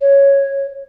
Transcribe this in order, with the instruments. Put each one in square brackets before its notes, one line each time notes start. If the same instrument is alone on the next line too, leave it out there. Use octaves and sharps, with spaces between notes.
[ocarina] C#5